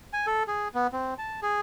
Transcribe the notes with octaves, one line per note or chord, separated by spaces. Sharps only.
G#5
A4
G#4
B3
C4
A5
G#4